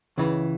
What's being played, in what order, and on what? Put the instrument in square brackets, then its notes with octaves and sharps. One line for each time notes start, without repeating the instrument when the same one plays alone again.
[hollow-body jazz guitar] C#2 C#3 E3